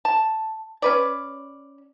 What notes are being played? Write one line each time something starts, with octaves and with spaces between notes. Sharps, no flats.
A5
C#4 B4 D5